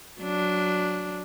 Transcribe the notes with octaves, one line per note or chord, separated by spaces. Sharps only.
F#3 D4